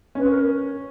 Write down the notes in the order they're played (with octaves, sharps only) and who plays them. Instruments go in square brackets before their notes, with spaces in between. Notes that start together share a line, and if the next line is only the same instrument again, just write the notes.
[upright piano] C#4 [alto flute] B4
[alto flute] A#4